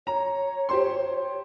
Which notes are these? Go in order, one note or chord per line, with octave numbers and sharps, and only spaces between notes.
C#5 A#5
G4 C5 C6